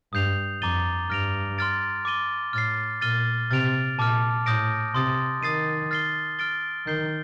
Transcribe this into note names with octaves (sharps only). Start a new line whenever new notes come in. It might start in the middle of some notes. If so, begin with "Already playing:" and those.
G2 D#6 G6 C7 F7
F2 A#5 D6 A6 D#7 G7
G2 F6 A#6 D7 F7
C6 F6 A6 D7
D6 A6 D#7 G7
A2 F6 A6 C7
A#2 F6 A6 D#7 G7
C3 F6 A6 D7 F7
A#2 A5 D6 F6
A2 D#6 G6 A#6 D7
C3 C6 D#6 A6
D#3 D#6 A6 C7 D#7
F6 A6 C7 G7
F6 A6 D7 G7
D#3 G6 C7 G7